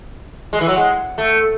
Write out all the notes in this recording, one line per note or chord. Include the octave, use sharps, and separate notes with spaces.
G#3
E3
F#3
G#3
A3